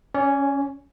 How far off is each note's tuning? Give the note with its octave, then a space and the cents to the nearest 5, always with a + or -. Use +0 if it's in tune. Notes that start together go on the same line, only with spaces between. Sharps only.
C#4 +0 D5 -40